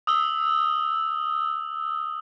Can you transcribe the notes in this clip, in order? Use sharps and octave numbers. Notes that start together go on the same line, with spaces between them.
D#6 E6 G7